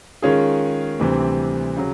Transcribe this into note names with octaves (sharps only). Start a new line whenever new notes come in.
D#3 G#3 C#4 F4 G#4
D2 C3 E3 G3 C4
C#3 F#3